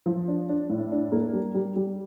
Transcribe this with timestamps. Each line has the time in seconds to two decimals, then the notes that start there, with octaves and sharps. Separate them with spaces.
0.06 F3
0.28 D4
0.49 D4
0.70 A2
0.92 D4
1.12 A#3
1.33 G3
1.54 G3
1.76 G3